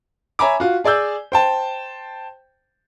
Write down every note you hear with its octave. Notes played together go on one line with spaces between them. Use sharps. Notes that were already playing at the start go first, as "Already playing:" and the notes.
C#5 E5 G#5 A#5 B5 D6
F4 F#4
G#4 D5 G#5 E6 G6
C5 G5 A5